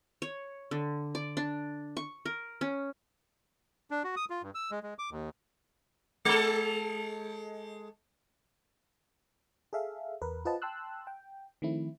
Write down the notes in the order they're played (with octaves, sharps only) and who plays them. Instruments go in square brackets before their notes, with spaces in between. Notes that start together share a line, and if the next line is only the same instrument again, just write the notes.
[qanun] C#5
D3
D5
D4
C#6
A#4
C#4
[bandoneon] D4
F#4
D#6
F4
G2
E6
G#3
G#3
D6
D#2
[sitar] G#3 A4
[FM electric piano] G#4 A4 E5 F5
E2 A#4 B4
F4 B4 C5 D#5 F#5 A5
G5 A5 C6 E6 F#6
G5
D#3 F3 A3 C4 E4